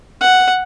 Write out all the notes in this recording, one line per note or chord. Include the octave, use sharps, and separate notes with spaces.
F#5